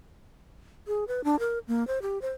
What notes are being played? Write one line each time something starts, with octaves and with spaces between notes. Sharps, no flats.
G#4
B4
D4
A#4
A#3
C5
G4
C5